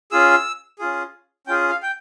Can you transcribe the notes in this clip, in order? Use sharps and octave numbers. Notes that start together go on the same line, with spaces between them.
C#4 F4 G#4 E6
C#4 F4 G#4
C#4 F4 G#4 G5
F5
G5